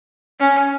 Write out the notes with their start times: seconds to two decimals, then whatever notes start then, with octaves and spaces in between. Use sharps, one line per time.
0.40 C#4